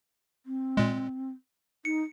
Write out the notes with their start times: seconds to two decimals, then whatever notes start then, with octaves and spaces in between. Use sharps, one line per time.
0.46 C4
0.77 A#2 G#3
1.85 D#4 C#7